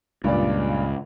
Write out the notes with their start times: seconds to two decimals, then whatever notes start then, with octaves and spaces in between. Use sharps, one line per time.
0.24 C#2 G2 A#2 D5